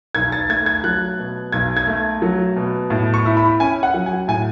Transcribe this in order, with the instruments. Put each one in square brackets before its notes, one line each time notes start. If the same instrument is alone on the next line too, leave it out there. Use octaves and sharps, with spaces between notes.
[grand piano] B1 G#6
A6
A3 G#6
G#6
F#3 F#6
B2
B1 G#6
G#6
A3
F#3
B2
A2
C#6
E4
B5
C#4 G#5
F#5
F#3
G#5
A2 G#5